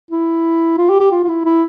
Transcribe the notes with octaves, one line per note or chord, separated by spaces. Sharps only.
E4
F4
G4
G4
F4
F4
E4
E4